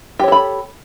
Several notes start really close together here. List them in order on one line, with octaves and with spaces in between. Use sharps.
G4 C#5 A4 B5